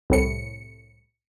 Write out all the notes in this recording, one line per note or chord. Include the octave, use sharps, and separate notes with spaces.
C2 A2 C#7